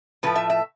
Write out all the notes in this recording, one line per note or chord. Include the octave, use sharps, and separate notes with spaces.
A2 F3 A3 B4
E5
E5